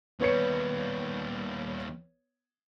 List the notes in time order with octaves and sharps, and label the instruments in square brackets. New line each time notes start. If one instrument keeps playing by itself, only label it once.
[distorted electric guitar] D#2 G3 [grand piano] B3 C#5 C#7